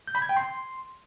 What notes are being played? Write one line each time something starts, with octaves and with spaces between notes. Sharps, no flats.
G6
B5
G#6
G5
C6